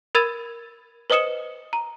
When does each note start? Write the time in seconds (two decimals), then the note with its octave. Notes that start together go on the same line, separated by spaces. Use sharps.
0.15 A#4 B5 E6 G#6 A6 D#7
1.10 B4 C5 D#5 D#6 C#7 E7
1.73 A#5